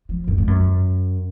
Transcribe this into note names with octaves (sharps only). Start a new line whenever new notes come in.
F3
F#2
G#2
F#2